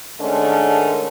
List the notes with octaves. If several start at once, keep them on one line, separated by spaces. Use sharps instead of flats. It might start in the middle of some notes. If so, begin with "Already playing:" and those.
G#2 D#3 A3 C#4 D4